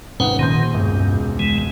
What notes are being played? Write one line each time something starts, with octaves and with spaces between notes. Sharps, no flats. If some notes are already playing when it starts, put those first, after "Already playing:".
G#1 C#4 B4 C5 F#5 D#6
A#1 D#3 C6 G6
E1 C#2 G2
E3 G#3